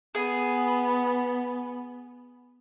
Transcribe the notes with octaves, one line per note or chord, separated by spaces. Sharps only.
B3 G#4